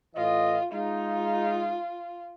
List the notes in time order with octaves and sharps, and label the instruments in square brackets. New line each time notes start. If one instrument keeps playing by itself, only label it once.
[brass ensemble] A2 E3 D#5 [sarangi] F4
[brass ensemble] G#3 D#4 [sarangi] F4